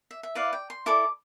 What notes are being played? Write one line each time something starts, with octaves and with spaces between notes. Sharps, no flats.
E5
E5
E4 B4 D5 F5
G5
C6
E4 A4 D5 D6